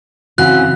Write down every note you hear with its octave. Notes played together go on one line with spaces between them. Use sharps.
C#3 E3 C4 F#4 F#6